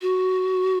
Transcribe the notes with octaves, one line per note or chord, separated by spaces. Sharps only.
F#4